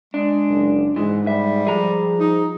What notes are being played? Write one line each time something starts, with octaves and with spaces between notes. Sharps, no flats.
G#3 D4
F#1
G#2 E3 G#3
G3 E5
F3 G#4 A#5
D#4